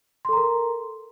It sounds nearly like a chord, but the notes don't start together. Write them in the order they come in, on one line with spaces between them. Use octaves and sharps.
C6 A4 A#5 A#4